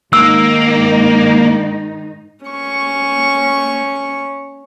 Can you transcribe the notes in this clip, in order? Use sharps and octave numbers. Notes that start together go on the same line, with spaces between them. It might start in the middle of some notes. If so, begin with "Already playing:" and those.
G#2 D#3 A#3 D#4 E6
C#4 C#6